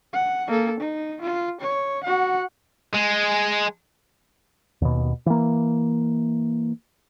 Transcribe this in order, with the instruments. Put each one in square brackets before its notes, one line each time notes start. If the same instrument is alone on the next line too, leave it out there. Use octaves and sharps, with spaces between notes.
[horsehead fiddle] F#5
A#3 A4
D#4
F4
C#5
F#4 F#5
[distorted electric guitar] G#3
[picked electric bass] D#2 B2
E3 A#3